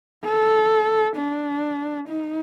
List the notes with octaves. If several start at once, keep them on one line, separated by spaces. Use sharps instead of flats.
A4
D4
D#4